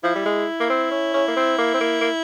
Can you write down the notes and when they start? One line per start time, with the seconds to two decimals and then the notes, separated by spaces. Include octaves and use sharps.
0.03 F3 E4
0.15 G3
0.26 G#3
0.60 A#3
0.70 C4
0.91 C#4
1.14 C#4
1.28 A#3
1.36 C4
1.58 A#3
1.74 C4
1.80 A#3
2.01 A#3